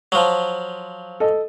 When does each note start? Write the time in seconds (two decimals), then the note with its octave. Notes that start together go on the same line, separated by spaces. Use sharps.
0.12 F3 F#3
1.20 A4 D#5